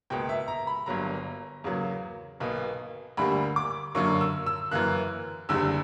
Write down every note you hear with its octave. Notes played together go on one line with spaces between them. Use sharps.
C#2 B2 A#3 G5
E5
A#5
B5
G1 G2 F#3 A#3 A#5
E2 C#3 F#3 A#3
B1 B2 A#3
D2 D3 G3 A#3 B5
D6
F#2 D3 F#3 A#3 C#6
E6
E6
F#2 E3 A#3 F#6
F#1 E2 D3 G3 E6